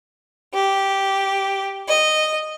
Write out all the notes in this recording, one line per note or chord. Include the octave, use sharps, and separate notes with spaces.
G4
D#5